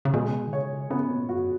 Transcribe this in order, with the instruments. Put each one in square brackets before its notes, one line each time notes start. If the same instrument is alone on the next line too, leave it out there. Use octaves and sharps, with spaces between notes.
[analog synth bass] C#3
[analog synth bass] B2 [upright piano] G#3
[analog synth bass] D#3
[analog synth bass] C#3 [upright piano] C#5
[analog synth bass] C#3 [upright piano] B3
[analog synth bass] A#2
[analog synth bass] F#2 [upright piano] F#4